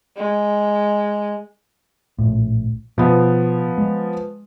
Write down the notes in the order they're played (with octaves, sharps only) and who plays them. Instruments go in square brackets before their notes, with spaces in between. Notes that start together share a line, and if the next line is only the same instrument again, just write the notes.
[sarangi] G#3
[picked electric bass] A#1 A2
[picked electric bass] B2 [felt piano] F3 B3
[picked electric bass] G#3